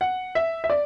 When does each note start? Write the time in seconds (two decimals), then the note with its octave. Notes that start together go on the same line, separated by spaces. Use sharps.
0.01 F#5
0.35 E5
0.64 E5
0.70 D5